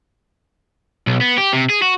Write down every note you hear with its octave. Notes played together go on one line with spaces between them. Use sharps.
B1
B3
G4
C3
G#4
F#4